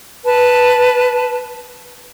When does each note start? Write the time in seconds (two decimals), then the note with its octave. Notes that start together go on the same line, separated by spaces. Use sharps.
0.24 B4 A5